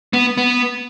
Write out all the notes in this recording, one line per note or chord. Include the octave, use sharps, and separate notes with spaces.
B3
B3